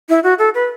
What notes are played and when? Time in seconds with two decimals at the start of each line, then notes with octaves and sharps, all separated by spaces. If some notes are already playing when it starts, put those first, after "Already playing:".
0.09 E4
0.23 F#4
0.39 A4
0.55 B4